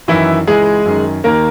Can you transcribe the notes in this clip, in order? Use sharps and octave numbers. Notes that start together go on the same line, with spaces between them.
F#2 D#3 E3 E4
C#2 C#3 E3 G#3 G#4
F#2 D#3
D#2 D#3 A#3 A#4